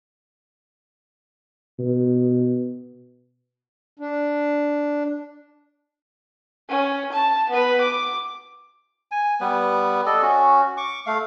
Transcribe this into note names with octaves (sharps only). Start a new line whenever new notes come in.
B2
D4
C#4
A5
B3 B4
D6
G#5
G3 B3 B4
A4 D5 D#5
C#4 F#4
C#6 D6
A3 F5